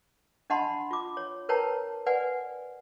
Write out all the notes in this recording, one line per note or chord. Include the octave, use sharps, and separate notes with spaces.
D4 D#5 F#5 A5 B5 C6
F4 D6
C#5
A#4 B4 C#5 G5 A5 A#5
B4 D5 F#5 G#5